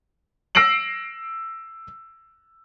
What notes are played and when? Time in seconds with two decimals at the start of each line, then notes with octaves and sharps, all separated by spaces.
0.55 E6 A#6 C7 D7 F#7